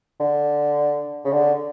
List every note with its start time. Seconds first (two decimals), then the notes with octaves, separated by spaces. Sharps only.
0.20 D3
1.25 C#3
1.32 D3